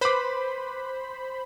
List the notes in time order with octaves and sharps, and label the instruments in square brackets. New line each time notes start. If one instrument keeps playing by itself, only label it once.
[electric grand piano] B4 D6 [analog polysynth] C5 B5